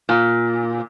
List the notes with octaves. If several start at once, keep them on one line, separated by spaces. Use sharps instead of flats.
A#2